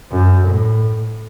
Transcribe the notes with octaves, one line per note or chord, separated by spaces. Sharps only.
F#2
A2